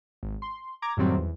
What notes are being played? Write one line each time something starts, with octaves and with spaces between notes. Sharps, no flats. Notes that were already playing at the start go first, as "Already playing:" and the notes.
G#1
C6
A#5 D6 G#6
F#2 A2 D#3 F#3 G3 C4
E2